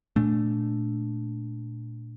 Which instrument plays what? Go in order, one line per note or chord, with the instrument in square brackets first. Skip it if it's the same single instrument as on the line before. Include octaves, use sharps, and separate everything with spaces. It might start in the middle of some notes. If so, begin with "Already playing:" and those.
[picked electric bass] A#2 A3 D4